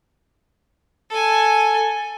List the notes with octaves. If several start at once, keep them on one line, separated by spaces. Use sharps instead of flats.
A4 G#5